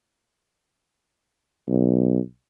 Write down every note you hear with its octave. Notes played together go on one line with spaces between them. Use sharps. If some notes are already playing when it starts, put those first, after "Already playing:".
B1